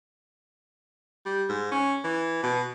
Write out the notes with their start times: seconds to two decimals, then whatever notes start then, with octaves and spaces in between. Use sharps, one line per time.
1.26 G3
1.49 G#2
1.71 C#4
2.04 E3
2.43 B2